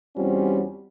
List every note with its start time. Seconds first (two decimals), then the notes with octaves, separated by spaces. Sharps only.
0.16 E2 G3 C4 C#4 F4 F#4